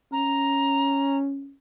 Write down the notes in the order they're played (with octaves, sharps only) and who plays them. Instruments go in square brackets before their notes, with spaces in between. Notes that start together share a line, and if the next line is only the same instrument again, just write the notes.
[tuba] C#4 [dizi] A#5